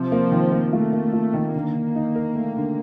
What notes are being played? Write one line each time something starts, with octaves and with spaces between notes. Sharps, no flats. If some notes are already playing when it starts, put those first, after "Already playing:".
Already playing: C3 F3
A#3
D#3
A#3
A3 F4
A#3
F4
D#3
D3 A#3
D3
D#4
A#4
A3
D3